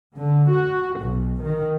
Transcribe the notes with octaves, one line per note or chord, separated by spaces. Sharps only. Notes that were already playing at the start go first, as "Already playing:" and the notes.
D3
F#4
B1
D#3